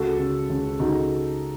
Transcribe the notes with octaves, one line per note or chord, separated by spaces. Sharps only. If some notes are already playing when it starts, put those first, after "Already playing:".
Already playing: C#2 F#4 A4
C#3
C#2
C#2 D#4 F#4